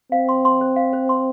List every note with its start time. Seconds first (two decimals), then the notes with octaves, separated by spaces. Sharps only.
0.12 C4 F5
0.29 C6
0.45 C6
0.61 C5
0.76 F5
0.93 C5
1.09 C6